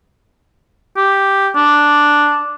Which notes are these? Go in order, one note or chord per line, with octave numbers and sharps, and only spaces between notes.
G4
D4